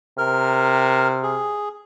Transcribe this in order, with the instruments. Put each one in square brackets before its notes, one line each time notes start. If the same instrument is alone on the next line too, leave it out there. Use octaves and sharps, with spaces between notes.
[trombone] C3 [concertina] A#4 F6
[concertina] G#4